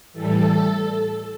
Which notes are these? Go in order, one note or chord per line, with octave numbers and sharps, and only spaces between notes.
A2 E3 G3 A4